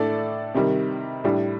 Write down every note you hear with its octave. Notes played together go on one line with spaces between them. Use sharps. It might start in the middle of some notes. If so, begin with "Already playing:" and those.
Already playing: A2 A3 D4 A4 D5
C3 D#3 G3
A2 G3 D4